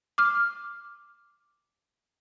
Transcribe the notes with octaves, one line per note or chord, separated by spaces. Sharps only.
D6 F6